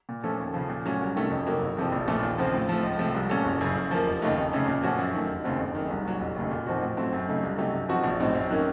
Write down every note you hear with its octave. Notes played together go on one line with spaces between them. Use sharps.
A#2
F3 A3 C#4 A4
D#2
C#3 F3
A#2
F#3 A3 C#4
C2
C3 D#3 A3 C#4
F2
C3 F#3 A#3
F#1
F2 C3 F3
A#1
A#2 F3 A3
D#2
C#3 F3 C4
A2
F3 A3
C#2
C3 F3 A3
C2
A#2 A3 C#4 A4
F#1
F#2 C#3
F#2
F3 A#3
F1
D#2 C#3 A3 D#4
F2
C#3 A3 C#4 A4
A#2
F3 A3 C#4 F#4
F#2
D#3 A3
F1
D#2 C#3 A3 C4
F#1
F#2 D#3
C2
A#2 F#3
F1
D#2 C#3 A3
A#2
F3 C4 D#4 F#4
A2
F#3 A3 C4
F#2
C#3 A3 D#4
C2
C3 F#3 A3 D#4
F#2
F3 C4 F#4
A#1
A2 F#3 C4 D#4
F#2
D#3 F#3 A#3 C#4